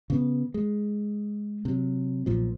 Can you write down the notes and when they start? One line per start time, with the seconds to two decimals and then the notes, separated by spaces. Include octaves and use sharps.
0.10 C#3 B3
0.54 G#3
1.65 C3 F#3
2.26 B1 A#2 F3